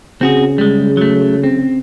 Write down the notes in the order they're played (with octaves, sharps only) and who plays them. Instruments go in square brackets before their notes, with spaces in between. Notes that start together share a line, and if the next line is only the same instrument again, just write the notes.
[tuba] C#3 [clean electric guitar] C4 F#4 G#4
[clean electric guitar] G3 G#3
F#3 A3
C4